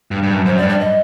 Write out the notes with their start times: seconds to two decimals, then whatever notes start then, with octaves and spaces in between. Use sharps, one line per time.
0.11 G2
0.23 G2
0.34 F#2
0.45 F#2 C5
0.57 D5
0.62 G2
0.69 D5
0.80 D#5